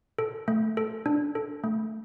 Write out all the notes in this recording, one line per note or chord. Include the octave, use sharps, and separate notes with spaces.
A4
A3
A4
D4
A4
A3